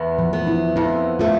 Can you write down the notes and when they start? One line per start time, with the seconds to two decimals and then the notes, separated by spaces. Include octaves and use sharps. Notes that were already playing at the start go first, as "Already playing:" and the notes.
Already playing: E2 B3
0.19 F3
0.33 B3
0.47 E4
0.76 F2 E4
1.19 A3 F4